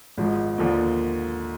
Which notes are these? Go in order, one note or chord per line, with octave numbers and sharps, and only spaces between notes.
G#1 G#2 F3
D#2 D3 F3 A#3